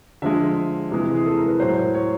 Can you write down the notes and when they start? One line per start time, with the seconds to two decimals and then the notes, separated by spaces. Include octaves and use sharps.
0.22 D3 F3 G#3 E5
0.91 C3 E3 G#3
1.15 G#4
1.26 A4
1.37 A#4
1.48 B4
1.60 A2 F#3 C5
1.94 C#5